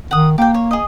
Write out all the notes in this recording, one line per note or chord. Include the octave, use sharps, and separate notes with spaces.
D#3 F#5 D#6
A#3 G4 G5
C#5
G#4 D#5